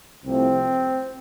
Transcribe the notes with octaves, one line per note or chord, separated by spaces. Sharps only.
C2 C3 F3 A3 C4